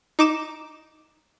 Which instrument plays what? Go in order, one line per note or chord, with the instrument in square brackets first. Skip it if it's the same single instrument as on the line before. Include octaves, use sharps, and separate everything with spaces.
[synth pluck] D#4 D6 E7